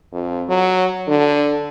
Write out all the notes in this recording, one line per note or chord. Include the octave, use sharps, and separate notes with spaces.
F2
F#3
D3